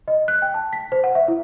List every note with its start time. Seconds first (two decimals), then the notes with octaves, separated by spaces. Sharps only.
0.08 D#5
0.28 F#6
0.42 G5
0.54 A5
0.73 B6
0.92 C5
1.04 F#5
1.15 E5
1.28 E4